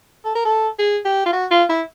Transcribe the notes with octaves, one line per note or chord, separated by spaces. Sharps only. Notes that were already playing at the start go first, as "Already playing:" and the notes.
A4
A#4
A4
G#4
G4
F4
F#4
F4
E4